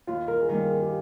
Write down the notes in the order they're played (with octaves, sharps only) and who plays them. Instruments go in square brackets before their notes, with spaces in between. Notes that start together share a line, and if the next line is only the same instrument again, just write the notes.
[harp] D#2 [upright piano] F4
[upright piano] A#4
G#4
[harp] D#3 G3 A#3 [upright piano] A#4
[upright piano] A#4
G#4
G4